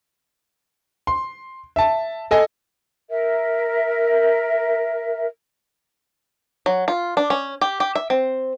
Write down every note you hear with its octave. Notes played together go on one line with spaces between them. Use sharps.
C6
E5 A5
A4 D#5 G#5
A#4 E5
F#3
F4
D4
C#4
G4
G4
E5
C4